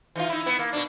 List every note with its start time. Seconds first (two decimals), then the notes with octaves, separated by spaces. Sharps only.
0.15 E3 D#4 F4
0.29 D#4 E4
0.43 B3 E4
0.59 A#3
0.73 B2 D4